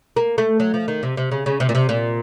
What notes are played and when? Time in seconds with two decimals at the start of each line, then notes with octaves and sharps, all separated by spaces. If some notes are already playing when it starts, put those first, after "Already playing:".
0.17 A#3
0.38 A3
0.60 F#3
0.74 F3
0.88 D#3
1.03 C3
1.17 C3
1.31 C#3
1.46 C#3
1.60 C3
1.69 A#2
1.75 C3
1.89 A#2